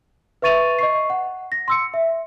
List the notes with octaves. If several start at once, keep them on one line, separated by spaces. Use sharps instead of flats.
B4 E5 C#6 A6 D#7 F7
D#5 C#6 C7
F#5
A#6
C6 E6 C#7
E5